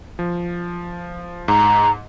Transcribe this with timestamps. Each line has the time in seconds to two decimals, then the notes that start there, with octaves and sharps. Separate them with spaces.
0.19 F3
1.48 G#2 A#5